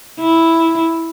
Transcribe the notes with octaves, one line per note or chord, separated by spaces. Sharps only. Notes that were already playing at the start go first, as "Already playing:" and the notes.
E4